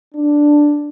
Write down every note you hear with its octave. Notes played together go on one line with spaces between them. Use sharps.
D4